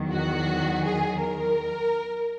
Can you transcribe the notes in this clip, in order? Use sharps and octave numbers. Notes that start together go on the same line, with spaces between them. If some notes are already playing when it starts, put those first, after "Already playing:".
Already playing: E2 D#3 F#3
F#4
G#4
A#4